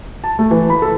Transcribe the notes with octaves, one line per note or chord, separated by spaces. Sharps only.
A5
A3
E3
B5
A4